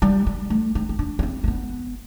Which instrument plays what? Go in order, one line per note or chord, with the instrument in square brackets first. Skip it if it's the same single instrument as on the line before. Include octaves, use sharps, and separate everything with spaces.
[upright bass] G3
G3
A3
C4
C4
D4
D4
C4
A3
B3